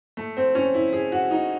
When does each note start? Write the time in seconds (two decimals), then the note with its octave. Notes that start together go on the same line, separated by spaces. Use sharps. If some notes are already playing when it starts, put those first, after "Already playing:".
0.17 A3
0.37 C4
0.55 C#4
0.74 E4
0.93 G#4
1.12 F#4
1.31 D#4